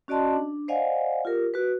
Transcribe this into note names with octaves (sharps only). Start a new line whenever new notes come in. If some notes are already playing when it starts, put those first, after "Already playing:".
C#4 F#4 D5 D#5 A5 C6
D4
C5 D5 D#5 F5 F#5 G#5
F4 G4 A#4
F#4 B4